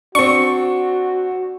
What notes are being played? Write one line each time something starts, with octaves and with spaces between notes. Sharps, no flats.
C4 D4 F#4 C#6